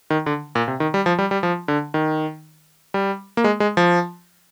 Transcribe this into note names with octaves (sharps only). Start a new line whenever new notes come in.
D#3
D3
A#2
C3
D#3
G3
F3
G3
G3
F3
D3
D#3
G3
A#3
G#3
G#3
F3